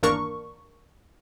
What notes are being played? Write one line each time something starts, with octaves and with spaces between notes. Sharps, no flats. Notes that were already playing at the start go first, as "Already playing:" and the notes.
G#1 E2 A#3 D4 A#4 C#6